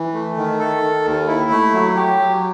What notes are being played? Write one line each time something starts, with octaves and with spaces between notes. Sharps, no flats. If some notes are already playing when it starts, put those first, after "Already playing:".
Already playing: E3
A3
D#3
A4
D#3
D#2
E4
A3
F#3
G4
F#3